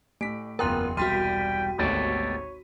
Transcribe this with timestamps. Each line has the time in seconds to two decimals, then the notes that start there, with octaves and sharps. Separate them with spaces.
0.21 A2 A3 B6 D7
0.59 F#1 E2 B3 F4 A#4 G5 A#5 C6
0.97 E1 C2 G3 F#4 G5 C6 B6 D#7
1.79 G#1 D2 D#3 B3 G4 A4 C#5